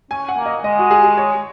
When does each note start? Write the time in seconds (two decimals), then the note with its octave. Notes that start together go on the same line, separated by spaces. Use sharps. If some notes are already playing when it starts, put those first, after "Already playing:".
0.11 C#4 G#5
0.29 F#5
0.37 A#3
0.46 D#5
0.64 G#3 D#5
0.79 F#4
0.91 G#4
1.04 G#4
1.18 C#5